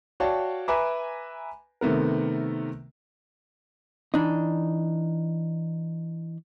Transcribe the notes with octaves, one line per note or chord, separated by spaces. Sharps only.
F#4 C#5 D5 F5 G5 A5
B4 E5 G#5 A#5 B5 D6
C3 D#3 A3 B3 A#4
E3 D4 D#4